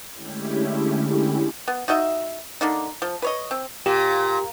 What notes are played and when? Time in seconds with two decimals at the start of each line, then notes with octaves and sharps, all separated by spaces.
0.14 D3 G#3 A3 C#4 E4 G4
1.68 B3
1.88 D#4 F#4 D#5 E5
2.61 D3 A#3 D#4
3.02 F3
3.22 B4 C#5 D#5
3.51 C4
3.86 A#2 G4